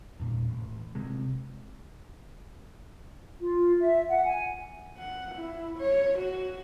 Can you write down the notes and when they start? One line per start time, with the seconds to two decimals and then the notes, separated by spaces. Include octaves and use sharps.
0.20 E2 A#2
0.50 A1
0.95 C3 G#3
3.39 F4
3.79 E5
4.09 F#5
4.24 G#5
4.97 F#5
5.35 E4
5.79 C#5
6.18 F#4